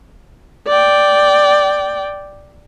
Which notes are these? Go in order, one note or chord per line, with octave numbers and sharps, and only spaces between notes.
D5 G5